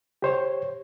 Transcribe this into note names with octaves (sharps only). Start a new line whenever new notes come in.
G4 C5 C#5